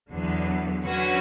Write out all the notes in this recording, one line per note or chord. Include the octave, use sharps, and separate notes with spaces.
E2 D3 F#3 B3
D3 F#3 C#4 F#4 B4